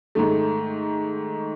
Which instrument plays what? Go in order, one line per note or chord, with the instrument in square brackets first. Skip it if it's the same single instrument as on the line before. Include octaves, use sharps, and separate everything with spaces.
[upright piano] G#2 D#3 A3